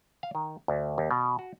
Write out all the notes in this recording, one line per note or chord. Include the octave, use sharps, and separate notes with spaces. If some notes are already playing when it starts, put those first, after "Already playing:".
F5
D#3
D2
D#2
B2
F#4